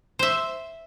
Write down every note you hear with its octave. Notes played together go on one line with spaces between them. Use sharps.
C5 E5